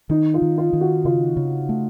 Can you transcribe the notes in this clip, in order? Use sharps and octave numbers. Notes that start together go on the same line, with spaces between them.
D#3 D#4
F4
D#3
F4
D#3
F#4
C#3 F4
C#3
A3